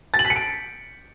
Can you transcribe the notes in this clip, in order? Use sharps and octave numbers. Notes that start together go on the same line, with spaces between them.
A6
F#7
B6
C#7
D7